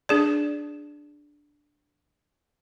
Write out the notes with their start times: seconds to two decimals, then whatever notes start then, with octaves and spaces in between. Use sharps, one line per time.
0.09 D4 G#4 D5